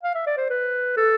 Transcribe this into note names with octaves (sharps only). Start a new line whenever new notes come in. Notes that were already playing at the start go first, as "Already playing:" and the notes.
F5
E5
D5
C5
B4
A4